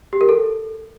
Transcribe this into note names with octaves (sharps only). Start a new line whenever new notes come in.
G4
A#4
A4